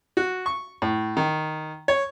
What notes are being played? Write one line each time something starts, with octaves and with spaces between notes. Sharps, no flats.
F#4
C#6
A2
D#3
C#5